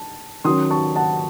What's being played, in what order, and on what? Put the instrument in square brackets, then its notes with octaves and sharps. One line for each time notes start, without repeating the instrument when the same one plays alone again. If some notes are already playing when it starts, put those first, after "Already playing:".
Already playing: [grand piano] A5
[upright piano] D#3 F#3 C#4 [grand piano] C6 D#6
[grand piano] A5 C#6
F#5 A5